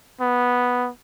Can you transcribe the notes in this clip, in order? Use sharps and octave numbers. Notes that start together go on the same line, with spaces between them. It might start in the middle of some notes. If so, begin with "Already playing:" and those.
B3